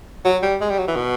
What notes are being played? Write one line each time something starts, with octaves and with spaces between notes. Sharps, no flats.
F#3
G3
G#3
G3
F#3
E3
B2